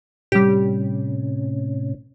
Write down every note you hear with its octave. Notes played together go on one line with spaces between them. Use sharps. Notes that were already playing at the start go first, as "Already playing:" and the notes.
A2 C3 G3 C#4 G4